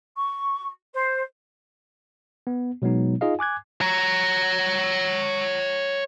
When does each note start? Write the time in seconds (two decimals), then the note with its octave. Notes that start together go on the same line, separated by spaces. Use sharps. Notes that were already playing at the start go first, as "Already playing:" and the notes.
0.16 C#6
0.94 C5
2.47 B3
2.82 B2 F#3 G#3 B3 D#4
3.21 D#4 F4 G#4 D#5 F5
3.39 G#5 D6 F#6 G#6
3.81 C#5 A#5